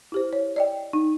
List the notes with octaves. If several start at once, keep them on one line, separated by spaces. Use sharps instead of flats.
E4 G4 C5
C#5
D5 D#5 G5
D#4